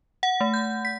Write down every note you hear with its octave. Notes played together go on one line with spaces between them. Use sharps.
F#5
A3
G6
B6